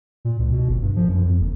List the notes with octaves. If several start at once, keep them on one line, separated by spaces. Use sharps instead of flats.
A#2
C#2
B2
G1
G2
F3
F#2
F2
F#1